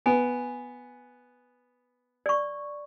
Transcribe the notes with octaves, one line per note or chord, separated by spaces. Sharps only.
B3 G#5
D5 C#6